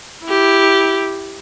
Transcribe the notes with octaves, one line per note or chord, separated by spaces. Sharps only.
E4 G4